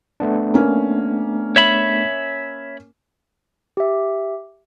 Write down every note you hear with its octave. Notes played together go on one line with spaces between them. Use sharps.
A3 B3 D4
A#3 C#4
C#5 E5 B5
G4 E5